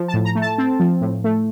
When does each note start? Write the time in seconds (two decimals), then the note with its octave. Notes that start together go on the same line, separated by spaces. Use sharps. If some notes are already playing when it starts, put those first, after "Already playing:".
Already playing: F3
0.08 A5
0.14 A2
0.25 A#5
0.35 A3
0.42 A5
0.58 C4
0.80 F3
1.01 A2
1.24 A3